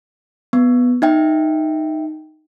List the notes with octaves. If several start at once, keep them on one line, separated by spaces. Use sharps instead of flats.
B3
D#4 E5 G5